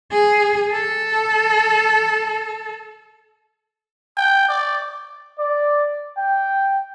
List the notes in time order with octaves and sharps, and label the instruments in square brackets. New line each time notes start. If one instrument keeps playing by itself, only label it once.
[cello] G#4
A4
[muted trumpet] G5
D5
[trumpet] D5
G5